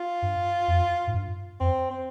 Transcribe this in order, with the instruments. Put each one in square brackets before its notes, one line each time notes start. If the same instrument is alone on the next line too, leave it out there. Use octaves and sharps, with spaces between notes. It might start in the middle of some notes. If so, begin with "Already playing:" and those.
Already playing: [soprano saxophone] F4
[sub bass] G2
F2
G#2
G2
[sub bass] F2 [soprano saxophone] C4
[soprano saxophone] C4